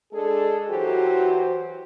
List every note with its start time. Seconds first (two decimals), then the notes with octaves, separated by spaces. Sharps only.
0.12 G#3 D4 G#4 A4
0.69 E3 F#3 F#4 G4 C5